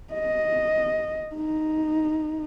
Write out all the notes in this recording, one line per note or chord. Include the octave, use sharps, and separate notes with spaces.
D#5
D#4